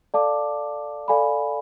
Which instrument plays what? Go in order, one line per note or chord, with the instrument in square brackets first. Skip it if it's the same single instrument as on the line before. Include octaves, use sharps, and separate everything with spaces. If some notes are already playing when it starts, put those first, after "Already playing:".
[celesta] A4 D5 F5 A5 D6
A4 D5 F5 G#5 B5